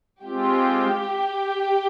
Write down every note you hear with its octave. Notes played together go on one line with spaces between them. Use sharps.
G#3 C4 F4 G4